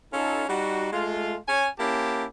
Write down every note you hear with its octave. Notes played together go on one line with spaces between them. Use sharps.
C#4 D#4 F4 A4
G3 D#4 F#4
G#3 A3 F4
C#4 G#5
A#3 C#4 E4 G4 A5